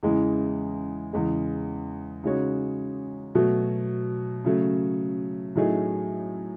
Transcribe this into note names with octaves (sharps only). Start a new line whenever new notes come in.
E2 C#3 E3 G#3
E2 C#3 G#3
C#3 G#3 D#4 F#4 C#5
B2 F#3 A3
C#3 F#3 A3
A2 F#3 A3 D#4 G#4